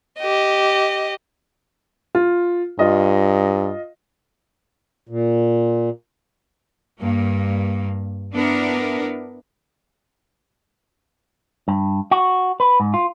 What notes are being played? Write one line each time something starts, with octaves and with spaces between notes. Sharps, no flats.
G4 D#5
F4
G2 F4 D#5
A#2
G2 A#3
B3 D4 E4 A#4
G2
F#4
B4
G#2
F4